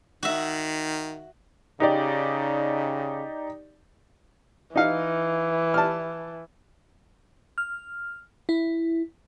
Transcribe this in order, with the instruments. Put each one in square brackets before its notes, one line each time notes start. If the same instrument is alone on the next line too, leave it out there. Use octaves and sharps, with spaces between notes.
[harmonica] D#3 [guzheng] F#4 E5
[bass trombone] C#3 [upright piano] D#4 G4 D5
[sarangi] E3 [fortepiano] D#4 F5
[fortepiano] A5 F6
[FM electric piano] F6
E4